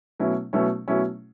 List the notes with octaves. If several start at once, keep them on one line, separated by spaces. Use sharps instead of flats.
B2 F#3 A3 C#4 E4
B2 F#3 A3 C#4 E4
B2 F#3 A3 C#4 E4